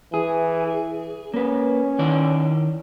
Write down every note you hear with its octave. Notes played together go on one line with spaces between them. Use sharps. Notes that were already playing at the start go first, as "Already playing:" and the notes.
E3 G#4
A#3 C#4 B4
D#3 E4 D5